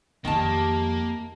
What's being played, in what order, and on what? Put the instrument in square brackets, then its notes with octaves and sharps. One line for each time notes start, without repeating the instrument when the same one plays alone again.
[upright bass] F2 [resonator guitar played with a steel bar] D#3 A5 [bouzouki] G3 G4 G#4 [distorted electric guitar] A#3